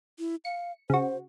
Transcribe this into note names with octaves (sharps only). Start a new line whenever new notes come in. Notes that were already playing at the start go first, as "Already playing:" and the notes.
E4
F5 C#7
C#3 F#4 C5